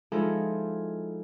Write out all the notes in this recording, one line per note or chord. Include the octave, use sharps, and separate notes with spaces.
F3 G#3 D#4 E4 G#4 A4